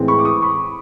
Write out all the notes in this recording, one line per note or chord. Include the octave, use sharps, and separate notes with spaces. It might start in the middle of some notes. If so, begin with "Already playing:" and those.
Already playing: A2 E3 G#3 C4
B5 C#6
D6
C#6 D#6
B5 C#6